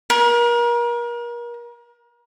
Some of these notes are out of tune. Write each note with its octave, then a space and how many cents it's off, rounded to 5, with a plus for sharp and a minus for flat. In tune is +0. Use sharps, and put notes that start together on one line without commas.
A#4 +35